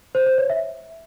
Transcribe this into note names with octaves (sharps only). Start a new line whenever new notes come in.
C5
C5
C#5
E5